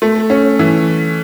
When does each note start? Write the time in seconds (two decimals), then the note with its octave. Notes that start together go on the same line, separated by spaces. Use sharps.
0.02 A3
0.30 C#4
0.59 E3